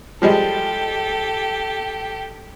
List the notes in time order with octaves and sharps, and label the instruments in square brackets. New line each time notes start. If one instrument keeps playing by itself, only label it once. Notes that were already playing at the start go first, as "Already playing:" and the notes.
[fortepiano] F3 G3 G#3 [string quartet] G4 A4